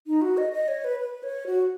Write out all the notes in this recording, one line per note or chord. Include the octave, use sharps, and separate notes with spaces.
D#4
F#4
D#5
D#5
C#5
B4
B4
C#5
F#4